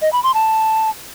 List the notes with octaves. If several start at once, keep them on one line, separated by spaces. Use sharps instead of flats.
D#5
B5
C6
A5